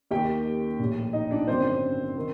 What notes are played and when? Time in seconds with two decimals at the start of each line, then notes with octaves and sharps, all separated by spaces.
0.11 D#2 D#3 G4 G5
0.79 A#1 A2
1.13 D#4 D#5
1.31 D4 D5
1.48 G1 F#2 D#3 C4 C5
2.16 D#3